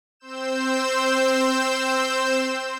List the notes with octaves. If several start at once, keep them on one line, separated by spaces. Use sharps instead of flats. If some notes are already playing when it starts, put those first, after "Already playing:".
C4 C5 E6 G6 E7